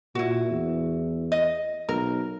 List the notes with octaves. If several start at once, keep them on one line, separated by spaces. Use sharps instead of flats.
A#2 E4 F#4
E2
D#5
B1 A#4